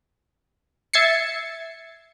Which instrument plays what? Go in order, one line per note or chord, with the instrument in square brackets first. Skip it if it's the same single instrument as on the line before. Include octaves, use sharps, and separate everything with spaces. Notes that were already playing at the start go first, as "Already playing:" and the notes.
[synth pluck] E5 G#6 A6 C7 C#7